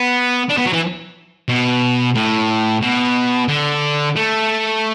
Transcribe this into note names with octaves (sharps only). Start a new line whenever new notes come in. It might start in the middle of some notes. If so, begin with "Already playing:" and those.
Already playing: B3
D4
B3
F#3
E3
B2
A2
B2
D3
A3